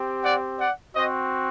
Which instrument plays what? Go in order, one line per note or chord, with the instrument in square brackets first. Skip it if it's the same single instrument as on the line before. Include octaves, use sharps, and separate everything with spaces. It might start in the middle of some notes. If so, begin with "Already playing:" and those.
Already playing: [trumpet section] C4 G4
D5 F#5
D5 F#5
C4 F#4 C5 D#5